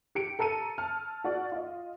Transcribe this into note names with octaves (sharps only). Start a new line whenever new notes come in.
G4 C#7 D7
A4 A#5 E6 C#7 D#7
A5 F6
F#4 D5 F#5
F4 D#5